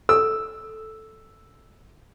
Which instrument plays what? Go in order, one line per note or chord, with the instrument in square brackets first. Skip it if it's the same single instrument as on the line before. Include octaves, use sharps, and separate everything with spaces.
[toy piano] A4 [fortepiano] E6